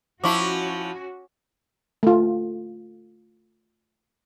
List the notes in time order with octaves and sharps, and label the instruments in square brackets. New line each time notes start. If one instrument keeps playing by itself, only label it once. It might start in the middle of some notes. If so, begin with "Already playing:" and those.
[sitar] F3 E4 [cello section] C#4 F#4 [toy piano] C#6 D6
[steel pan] A3 F4